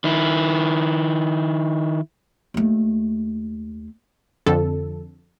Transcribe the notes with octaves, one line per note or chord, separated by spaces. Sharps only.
D#3 E4
D#2 A3
F2 D3 A4